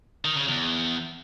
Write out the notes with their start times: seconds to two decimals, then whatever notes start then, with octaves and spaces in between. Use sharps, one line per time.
0.25 D#3
0.36 C#3
0.48 E2